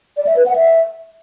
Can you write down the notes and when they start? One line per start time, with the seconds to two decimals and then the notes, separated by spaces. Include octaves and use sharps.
0.17 D5
0.27 E5
0.36 B4
0.46 F#5
0.56 E5